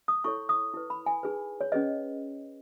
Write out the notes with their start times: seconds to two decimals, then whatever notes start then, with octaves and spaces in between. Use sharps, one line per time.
0.08 D#6
0.24 E4 A4 C#5 C#6
0.49 D#6
0.74 E4 B4
0.90 B5
1.06 G#5
1.23 D#4 G#4 B4
1.61 C#5
1.72 C#4 G#4 B4 D#5